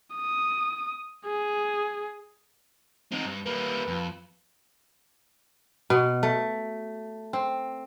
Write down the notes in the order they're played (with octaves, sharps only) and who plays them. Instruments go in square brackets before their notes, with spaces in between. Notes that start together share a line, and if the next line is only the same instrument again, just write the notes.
[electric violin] D#6
G#4
[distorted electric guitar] C4 D#4
G2
[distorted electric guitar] G3 A#3 [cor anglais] B4
[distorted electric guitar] F2
[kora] B2
A3
C4